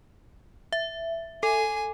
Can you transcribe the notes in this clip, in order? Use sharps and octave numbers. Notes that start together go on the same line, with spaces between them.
E5
A4 G#5